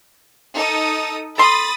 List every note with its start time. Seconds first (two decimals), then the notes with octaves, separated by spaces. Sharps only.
0.54 D#4 A4 D#6
1.38 A4 B5 C6 D#6 A6